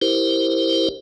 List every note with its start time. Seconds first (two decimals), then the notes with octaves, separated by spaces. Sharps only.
0.02 E4 G4 A#4 C5